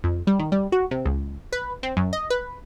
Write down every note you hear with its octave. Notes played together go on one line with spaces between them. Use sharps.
F2
G3
D#3
G3
F#4
C3
C#2
B4
C4
F#2
D#5
B4